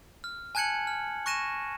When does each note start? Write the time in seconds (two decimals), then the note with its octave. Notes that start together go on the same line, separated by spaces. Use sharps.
0.24 F6
0.55 G#5 A5 F#6 G#6 C#7 F#7
0.87 F6
1.26 C#6 F#6 A#6 D#7 E7